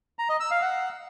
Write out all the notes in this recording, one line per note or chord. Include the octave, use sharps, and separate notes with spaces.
A#5
D#5
E6
F5
F#5